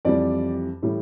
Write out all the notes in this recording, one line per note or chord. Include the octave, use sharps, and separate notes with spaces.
F2 E3 G3 D5
A2 E3 G3